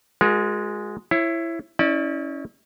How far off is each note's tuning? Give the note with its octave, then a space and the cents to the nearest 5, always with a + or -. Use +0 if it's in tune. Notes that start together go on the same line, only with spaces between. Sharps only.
G#3 +0 F#4 -45 A#4 +30
E4 +15 C#5 -25
C#4 +0 E4 -35 D5 +20